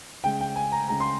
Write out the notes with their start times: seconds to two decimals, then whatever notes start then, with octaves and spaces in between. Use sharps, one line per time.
0.23 C#3 G#3 G5
0.40 G5
0.56 G#5
0.72 A#5
0.88 C#3 G#3 A#5
1.00 C6